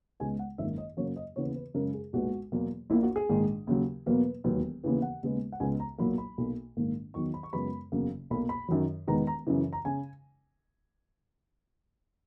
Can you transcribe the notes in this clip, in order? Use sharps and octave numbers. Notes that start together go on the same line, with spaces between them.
C#2 C#3 G#3 B3 G#5
F#5
G#1 F#2 D#3 A#3 E5
D#5
F#2 C#3 F#3 A#3 C#5
D#5
D#2 C#3 E3 B3 C#5
B4
F#2 C#3 G#3 A#4
G#4
B1 A#2 G#3 B3 F#4
E2 B2 F#3 A#3
A#1 A#2 A#3 E4
F#4
G#4
A#1 G#2 D#3 G#3
D#2 C#3 F#3
E2 B2 F#3 A#3 B4
E1 D#2 D#3 F#3 B3
D#2 C#3 E3 B3
F#5
D#2 C#3 G#3 B3
F#5
C#2 C#3 G#3 B3 G#5
A#5
B1 A#2 F#3 A#3 B5
B5
B1 B2 A#3
A#1 G#2 D#3 A#3
E2 D#3 F#3 C#6
B5
C#6
F#2 C#3 G#3 B3 B5
F#1 E2 C#3 F#3 A#3
B1 B2 A#3 B5
B5
F#2 D#3 F#3
E1 E2 D#3 G#3 B3 A#5
A#5
F#2 C#3 E3
A#5
C#3 G#5